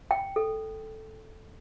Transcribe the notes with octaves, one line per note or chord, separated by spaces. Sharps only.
G5
A4